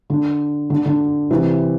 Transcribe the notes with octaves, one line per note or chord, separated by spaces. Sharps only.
D3
D3
D3
C3 E3